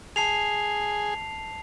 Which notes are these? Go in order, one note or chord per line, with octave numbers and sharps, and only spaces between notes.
G#4 A5 C7 F7